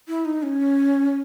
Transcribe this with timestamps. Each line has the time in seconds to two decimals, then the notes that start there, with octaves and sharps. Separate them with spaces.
0.08 E4
0.25 D#4
0.43 C#4